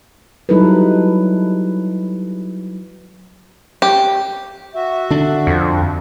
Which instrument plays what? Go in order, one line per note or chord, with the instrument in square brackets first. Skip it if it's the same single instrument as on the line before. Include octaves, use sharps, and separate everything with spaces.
[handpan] F#3 G3 D#4 E4 A4 B4
[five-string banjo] G4
[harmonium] F#4 E5
[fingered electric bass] D3 D4
[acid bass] F2